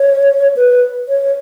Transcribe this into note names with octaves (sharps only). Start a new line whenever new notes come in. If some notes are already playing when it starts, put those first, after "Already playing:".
Already playing: C#5
B4
C#5